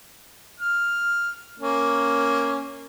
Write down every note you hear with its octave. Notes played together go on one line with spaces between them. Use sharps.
F6
A#3 C#4